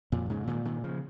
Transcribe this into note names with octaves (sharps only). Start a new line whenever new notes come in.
F2 A#2
G#2 C#3
A#2 D#3
A#2 D#3
C#3 F3